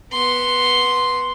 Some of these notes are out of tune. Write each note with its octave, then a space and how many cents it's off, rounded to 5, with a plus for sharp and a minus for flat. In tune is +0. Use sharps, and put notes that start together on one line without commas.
B3 -10 C6 +0